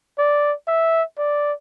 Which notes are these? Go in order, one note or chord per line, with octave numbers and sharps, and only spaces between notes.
D5
E5
D5